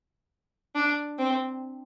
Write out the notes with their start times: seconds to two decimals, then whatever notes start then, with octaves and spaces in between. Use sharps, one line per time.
0.75 D4
1.18 C4